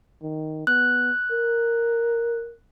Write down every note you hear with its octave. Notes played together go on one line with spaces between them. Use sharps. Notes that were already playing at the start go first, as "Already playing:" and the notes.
D#3
B3 F#6
A#4